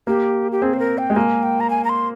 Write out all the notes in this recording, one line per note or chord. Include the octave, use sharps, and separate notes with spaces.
A#3 G4
G4
C4 G#4
C5
A#4
G5
G#3
A#3 G#5
G5
A#5
G#5
A#5
C6